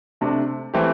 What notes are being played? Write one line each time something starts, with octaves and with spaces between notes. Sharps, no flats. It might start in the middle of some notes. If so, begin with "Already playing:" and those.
C3 A3 D4
E3 A3 C4 G4